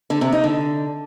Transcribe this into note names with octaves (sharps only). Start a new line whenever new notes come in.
D3
C3
D#4
D3